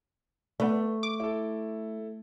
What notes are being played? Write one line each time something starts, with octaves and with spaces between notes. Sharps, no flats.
A3 B3 B4 D5
D6
E4 A4